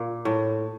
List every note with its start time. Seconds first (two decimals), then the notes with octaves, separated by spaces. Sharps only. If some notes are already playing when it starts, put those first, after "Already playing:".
Already playing: A#2
0.25 A2